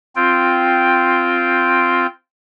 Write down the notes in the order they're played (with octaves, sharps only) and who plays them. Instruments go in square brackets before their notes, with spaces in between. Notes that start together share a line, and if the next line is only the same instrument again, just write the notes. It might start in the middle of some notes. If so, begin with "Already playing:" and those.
[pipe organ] C4 F4 G5